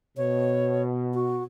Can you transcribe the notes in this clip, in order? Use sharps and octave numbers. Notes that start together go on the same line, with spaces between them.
B2 C#5
F#4